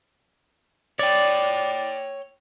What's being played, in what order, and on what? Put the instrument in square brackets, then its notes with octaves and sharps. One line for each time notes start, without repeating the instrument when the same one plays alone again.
[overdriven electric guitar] C#5 G5 [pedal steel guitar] D5